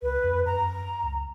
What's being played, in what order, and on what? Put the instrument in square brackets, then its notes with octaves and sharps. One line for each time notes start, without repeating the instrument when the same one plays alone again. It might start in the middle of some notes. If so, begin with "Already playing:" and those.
[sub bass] C#2 [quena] B4
[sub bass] F2
[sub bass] F#2 [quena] A#5
[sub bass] C#2